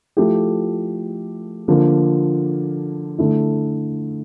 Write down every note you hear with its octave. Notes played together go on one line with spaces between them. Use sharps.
F3 A3 E4 G4
D3 F3 A#3
D3 A3 E4